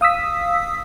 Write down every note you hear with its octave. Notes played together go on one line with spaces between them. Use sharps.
F5 D#6 E6 B6